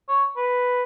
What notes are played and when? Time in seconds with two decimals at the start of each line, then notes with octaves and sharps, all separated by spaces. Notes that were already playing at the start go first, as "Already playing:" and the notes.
0.08 C#5
0.37 B4